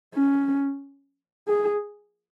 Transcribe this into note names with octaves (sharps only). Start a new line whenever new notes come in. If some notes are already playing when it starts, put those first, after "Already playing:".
C#4
G#4